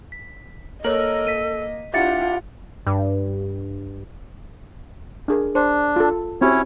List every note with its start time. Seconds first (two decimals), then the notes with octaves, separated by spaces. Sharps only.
0.12 B6
0.84 A#3 A4 A#4 C#5 D#5 F#7
1.27 A#3 B6 D#7
1.94 D4 E4 F4 G4 E5 F#5 A6 C#7
2.87 G2
5.28 D4 G#4 A#4
5.55 D4 C5
5.96 F4 A4
6.41 C4 C#4 E4 F#4 G4 C#5